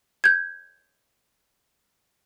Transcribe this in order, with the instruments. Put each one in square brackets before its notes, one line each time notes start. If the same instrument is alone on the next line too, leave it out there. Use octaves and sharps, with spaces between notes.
[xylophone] G6 G#6